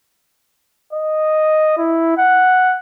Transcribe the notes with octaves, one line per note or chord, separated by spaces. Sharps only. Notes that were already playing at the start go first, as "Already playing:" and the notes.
D#5
E4
F#5